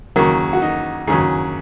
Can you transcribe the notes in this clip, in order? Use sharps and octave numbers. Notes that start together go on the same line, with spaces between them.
D#2 C#3 F#3 A#3
F#4
D#4
D#2 C#3 F#3 G#4